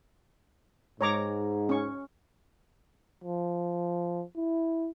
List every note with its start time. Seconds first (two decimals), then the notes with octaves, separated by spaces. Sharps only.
1.01 G#2 C#5 A#5 D6
1.69 C#4 C#6
3.24 F3
4.37 E4